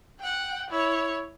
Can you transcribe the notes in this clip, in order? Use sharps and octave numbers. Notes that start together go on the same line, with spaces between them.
F#5 G5
E4 C#5